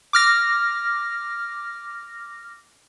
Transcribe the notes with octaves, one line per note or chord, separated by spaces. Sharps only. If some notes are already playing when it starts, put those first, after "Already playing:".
D6 F6 A#6